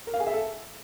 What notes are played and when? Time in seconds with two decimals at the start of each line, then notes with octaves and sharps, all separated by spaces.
0.07 A#4
0.14 F5
0.20 G#4
0.27 E5
0.33 A4